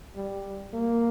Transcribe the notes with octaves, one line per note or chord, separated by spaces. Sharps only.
G3
A#3